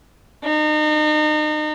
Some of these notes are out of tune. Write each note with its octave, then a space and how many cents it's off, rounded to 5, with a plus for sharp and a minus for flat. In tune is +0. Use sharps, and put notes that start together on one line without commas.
D#4 -35